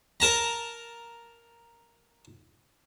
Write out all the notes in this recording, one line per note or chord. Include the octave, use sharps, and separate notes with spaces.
A#4 A5 A#5